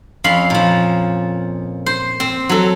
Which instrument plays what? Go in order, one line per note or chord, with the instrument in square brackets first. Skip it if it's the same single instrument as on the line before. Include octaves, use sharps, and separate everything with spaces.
[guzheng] F2 C#4 F5 B5 C6
A#2 F3
C5
C4
F#3 A4